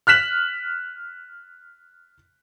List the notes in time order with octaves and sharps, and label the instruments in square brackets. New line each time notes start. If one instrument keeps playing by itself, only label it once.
[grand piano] F6 F#6 B6 E7 F#7